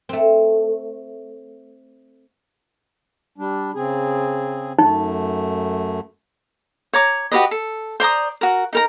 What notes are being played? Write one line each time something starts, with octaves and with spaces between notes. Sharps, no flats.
A3 C4
G3 D4
C#3 C4 G#4
F#2 A3 D#4
C#5 A#5 D6
F#4 G4 B4 D#5
A4
C5 D5 A#5 D#6
F#4 A#4
D#4 A#4 A#5